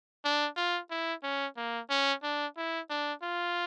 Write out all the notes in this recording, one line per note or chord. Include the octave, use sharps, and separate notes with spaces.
D4
F4
E4
C#4
A#3
C#4
D4
E4
D4
F4